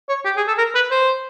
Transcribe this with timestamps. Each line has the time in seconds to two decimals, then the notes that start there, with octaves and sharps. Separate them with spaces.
0.09 C#5
0.25 G4
0.37 G#4
0.48 A4
0.58 A#4
0.75 B4
0.91 C5